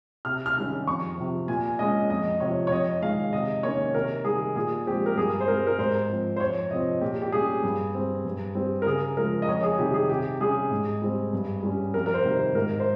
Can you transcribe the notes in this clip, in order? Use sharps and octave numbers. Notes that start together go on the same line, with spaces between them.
C3 F6
F6
D#3 G3 C#4
F2 C#6
C3 F3
A#2 G#5
G#3 C#4 D#5
F2 D#5
C3 F3 C#5
C#5
F2 D#5
D#3 G#3 F5
C3 D#5
D#3 A#3 C#4 C#5
C3 A#4
D#3 G3 G#4
A#2 G#4
F3 G#3 C4 G4
A#4
G2 G#4
C5
G3 C4 A#4
A#4
G#2 C5
F3 C4
C5
F2 C#5
C3 F3 C4 D#5
A#2 G4
G4
G3 C#4 G#4
G2
G3 C4
G2
G3 C4
A#4
C#3 G#4
F3 G#3 A#4
D#5
F2 C#5
G#4
C3 D#3 G3 G4
G#4
C3 G4
G3 C#4 G#4
G#2
G3 C4
G2
G3 C#4
F2 A#4
A#4
C5
C3 D#3 G3
C5
G#2 A#4
C5